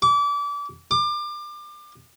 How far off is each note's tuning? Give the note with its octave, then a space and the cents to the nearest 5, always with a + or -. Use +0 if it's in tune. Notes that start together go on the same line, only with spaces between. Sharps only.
D6 -30
D6 +30